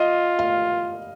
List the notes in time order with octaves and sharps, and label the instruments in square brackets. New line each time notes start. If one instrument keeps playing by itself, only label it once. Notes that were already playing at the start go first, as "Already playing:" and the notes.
Already playing: [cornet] F4 [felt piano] D#5
[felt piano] F5